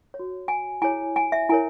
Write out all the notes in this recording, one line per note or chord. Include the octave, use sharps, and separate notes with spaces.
C#5
F#4
G#5
E4 G#4 C#5 G#5
G#5
E5
E4 A#4 C#5 G#5